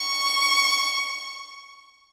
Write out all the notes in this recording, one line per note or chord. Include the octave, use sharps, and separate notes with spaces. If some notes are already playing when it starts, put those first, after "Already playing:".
Already playing: C#6